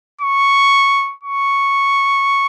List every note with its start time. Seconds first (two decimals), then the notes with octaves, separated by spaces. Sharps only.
0.21 C#6
1.24 C#6